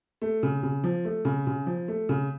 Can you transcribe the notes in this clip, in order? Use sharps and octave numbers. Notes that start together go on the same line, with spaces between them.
A3
C#3
C#3
F3
A3
C#3
C#3
F3
A3
C#3